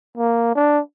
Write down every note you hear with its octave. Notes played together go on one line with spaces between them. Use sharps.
A#3
D4